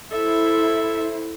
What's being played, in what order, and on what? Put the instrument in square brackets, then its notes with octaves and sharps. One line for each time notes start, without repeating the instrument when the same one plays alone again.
[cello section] E4 C5 [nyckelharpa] A4 E5